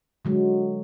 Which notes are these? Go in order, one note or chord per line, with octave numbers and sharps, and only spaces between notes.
D3 F#3 G#3